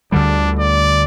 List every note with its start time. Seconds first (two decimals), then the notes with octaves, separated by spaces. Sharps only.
0.12 D2 D3 G3 D4
0.59 D5